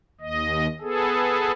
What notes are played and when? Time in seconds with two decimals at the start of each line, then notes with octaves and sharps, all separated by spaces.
0.21 D#2 D#5
0.81 B3 G#4 A4